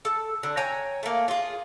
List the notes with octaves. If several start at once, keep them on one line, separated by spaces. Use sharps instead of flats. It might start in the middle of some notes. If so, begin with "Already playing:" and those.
A4
D3
C#5 G5 G#5 A#5
A3 A#3
F4 G#4